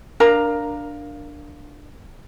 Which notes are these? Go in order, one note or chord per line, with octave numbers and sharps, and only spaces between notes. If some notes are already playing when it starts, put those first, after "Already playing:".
D4 A#4 F5 A#5